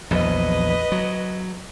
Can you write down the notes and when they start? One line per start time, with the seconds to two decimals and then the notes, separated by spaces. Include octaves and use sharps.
0.11 A#1 E2 F#3 B4 D#5
0.92 F#3